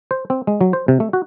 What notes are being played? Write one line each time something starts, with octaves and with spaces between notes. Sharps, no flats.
C5
C4
G#3
F#3
C5
C3
A3
F#4